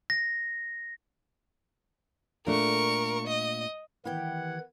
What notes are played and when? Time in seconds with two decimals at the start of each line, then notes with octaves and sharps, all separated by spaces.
0.10 A#6
2.47 A#2 A3 D4 A#4 C#6
3.27 D#5
4.05 D#3 E3 B3 E4 G4 F#5 G5 G#6